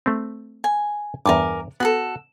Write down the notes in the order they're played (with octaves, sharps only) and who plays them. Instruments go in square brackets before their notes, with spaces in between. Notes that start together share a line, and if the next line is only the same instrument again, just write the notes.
[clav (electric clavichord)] A3 C4
[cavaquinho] G#5
[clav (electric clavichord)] E2 G2 [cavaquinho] A#4 G#5 D6
[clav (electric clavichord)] B3 [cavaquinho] F#4 G#4 A4